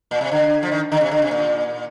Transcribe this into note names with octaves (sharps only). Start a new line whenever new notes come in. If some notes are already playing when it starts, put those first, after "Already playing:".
A#2
C3
D3
F3
D#3
D3
C3
D3
C3
A#2